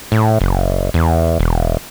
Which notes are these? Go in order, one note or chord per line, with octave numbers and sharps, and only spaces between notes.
A2
F#1
E2
E1